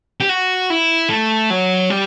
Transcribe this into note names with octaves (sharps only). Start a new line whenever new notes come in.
G4
F#4
E4
A3
F#3
G3